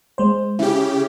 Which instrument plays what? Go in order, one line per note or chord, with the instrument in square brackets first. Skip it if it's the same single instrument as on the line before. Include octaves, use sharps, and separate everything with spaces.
[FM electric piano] G#3 C5
[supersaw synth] C#3 G4 [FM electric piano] E4